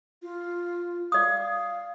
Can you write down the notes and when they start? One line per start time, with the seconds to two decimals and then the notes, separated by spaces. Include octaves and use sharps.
0.22 F4
1.12 D5 F5 D#6